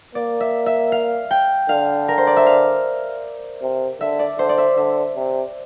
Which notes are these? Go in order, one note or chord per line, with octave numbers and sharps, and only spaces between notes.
A#3 D5
E5
E5
F5
G5
D3 F5
A#4
C5
D5
E5
F5
C3
D3 E5
D5
D3 C5
D5
E5
D3 E5
C3